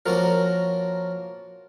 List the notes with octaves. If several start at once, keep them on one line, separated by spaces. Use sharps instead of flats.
F3 A#3 C#4 F#4 A#4